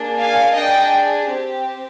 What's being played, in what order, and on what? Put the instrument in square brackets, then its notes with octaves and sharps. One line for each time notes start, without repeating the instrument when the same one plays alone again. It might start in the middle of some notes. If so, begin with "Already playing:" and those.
Already playing: [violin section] A#3 D4 G#4
F5 G#5
D4 G#4 D#5 G5
C4 G4